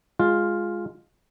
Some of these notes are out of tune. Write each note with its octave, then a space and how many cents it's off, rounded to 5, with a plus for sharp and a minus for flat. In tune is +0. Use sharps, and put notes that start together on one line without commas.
G#3 +0 F4 +5